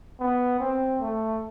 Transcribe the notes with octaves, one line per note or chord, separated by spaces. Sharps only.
B3
C4
A3